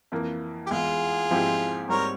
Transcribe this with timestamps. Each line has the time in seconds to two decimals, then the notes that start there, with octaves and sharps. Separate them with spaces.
0.12 F2 E3 A#3
0.66 G4
0.70 E2 E3 G#3 E4 F4 G#4
1.30 G#2 F3 C4 E4 G4
1.89 G#2 G3 C4 A#4 C#5